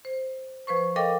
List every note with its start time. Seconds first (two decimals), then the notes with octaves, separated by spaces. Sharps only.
0.05 C5
0.67 F3 B4 C5 C#6
0.96 A4 A#4 D#5 F5 G5 D6